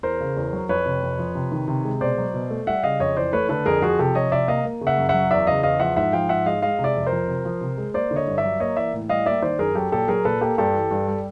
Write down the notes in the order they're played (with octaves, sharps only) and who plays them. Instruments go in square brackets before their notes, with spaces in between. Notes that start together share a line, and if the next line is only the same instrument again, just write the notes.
[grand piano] E2 A#4 C5
C#3
E2
F#3
F2 B4 C#5
C3
F2
F3
C3
D#3
C3
G#3
B2 C5 D5
F#3
B2
A3
G3 E5 F#5
C#3 D#5 F5
F2 C#5 D#5
E3 C5 D5
A3 B4 C#5
D3 A4 B4
F2 G#4 A#4
F3 F#4 G#4
C3 G4 A4
F3 C#5 D#5
C3 D5 E5
A#3 D#5 F5
A#3
C#3
E5 F#5
F#2
F#3 E5 F#5
E2 D5 E5
C#3 D#5 F5
E2 D#5 F5
F3 E5 F#5
G#2 E5 F#5
F3 F5 G5
G#2 E5 F#5
G#3 D#5 F5
G#3 D#5 F5
C3
D5 E5
F2
A#4 C5
F3
C3
F3
C3
G#3
A#3 C5 D5
D3
C#5 D#5
G2
D5 E5
F#3
A#3 C#5 D#5
E3 D5 E5
A2
G3 D#5 F5
A#3 D5 E5
D#3 C5 D5
F#2 G#4 A#4
F#3 G4 A4
A#2 G4 A4
F#3 G#4 A#4
A#2 A4 B4
A#3 G4 A4
G2 G4 A4
E3
G2
G3